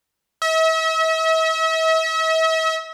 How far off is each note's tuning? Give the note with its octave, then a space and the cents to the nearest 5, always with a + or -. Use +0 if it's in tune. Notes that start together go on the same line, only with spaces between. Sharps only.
E5 -40